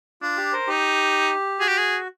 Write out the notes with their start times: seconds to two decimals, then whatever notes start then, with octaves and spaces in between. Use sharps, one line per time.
0.22 D4 F4
0.37 G4
0.52 A#4 C5
0.67 D#4 G4
1.59 F#4 G#4
1.68 G4
1.78 G#4